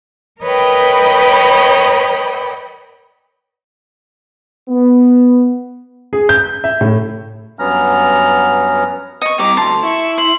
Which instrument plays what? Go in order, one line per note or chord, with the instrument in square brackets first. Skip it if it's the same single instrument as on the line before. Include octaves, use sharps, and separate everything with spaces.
[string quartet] A#4 B4 C#5 D#5 G5 B5
[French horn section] B3
[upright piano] G#4
G6
E5
A2
[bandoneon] G2 F#3 B3 C#4 A#5 F6
[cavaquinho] D#5 C#6 [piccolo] C#7
[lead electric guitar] G3 C4 [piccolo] A#5 [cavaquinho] D6
[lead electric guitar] D2 [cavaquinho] A5 C6
[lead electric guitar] E4 [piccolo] C#6
[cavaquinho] C6 [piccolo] F#7